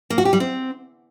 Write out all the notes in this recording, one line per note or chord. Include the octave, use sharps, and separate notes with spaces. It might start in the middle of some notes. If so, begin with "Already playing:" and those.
A#3
F#4
G4
G3
C4